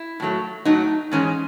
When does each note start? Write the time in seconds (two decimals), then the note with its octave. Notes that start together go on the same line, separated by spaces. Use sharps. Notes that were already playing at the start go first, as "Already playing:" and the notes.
Already playing: E4
0.20 A2 F#3 A3
0.65 A2 F#3 A3 D#4
1.12 G#2 E3 G#3 C#4